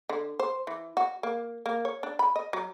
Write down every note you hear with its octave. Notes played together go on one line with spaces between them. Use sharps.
D3
C5
E3
F#4
A#3
A#3
C#5
D4
B5
D#5
F#3